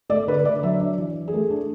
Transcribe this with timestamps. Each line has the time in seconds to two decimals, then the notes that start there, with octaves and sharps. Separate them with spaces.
0.09 A3 D5
0.27 D3 B4
0.45 D3 D5
0.63 F#3 E5
0.80 D4 D5
0.98 E3
1.15 E3
1.28 G#4
1.33 A3
1.50 D4